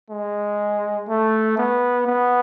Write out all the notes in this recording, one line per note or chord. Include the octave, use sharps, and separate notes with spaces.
G#3
A3
B3
B3